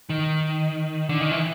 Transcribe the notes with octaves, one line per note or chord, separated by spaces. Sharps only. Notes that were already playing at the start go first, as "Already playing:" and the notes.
D#3
D3
D#3
E3